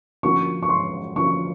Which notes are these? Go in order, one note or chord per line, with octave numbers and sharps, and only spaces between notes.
D3 F3 A#3 C#4 F#4 C#6
C#6
C6
D3 F3 A#3 C#4 F#4 C#6